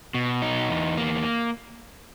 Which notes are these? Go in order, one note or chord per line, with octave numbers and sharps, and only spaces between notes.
B2
D#4
E2
A#3